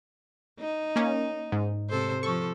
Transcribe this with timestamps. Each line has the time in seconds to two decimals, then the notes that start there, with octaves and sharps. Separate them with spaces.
0.59 D#4
0.96 A#3 C#4
1.52 G#2
1.90 C3 A4 C5
2.23 F3 A4 C#6